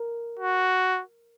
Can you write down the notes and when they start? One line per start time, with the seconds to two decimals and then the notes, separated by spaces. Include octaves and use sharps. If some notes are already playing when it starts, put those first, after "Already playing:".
Already playing: A#4
0.39 F#4